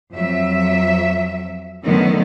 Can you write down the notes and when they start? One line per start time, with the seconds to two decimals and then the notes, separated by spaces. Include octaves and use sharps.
0.12 F2 F#3 E5
1.85 F#2 D3 D#3 F#3 A3 B3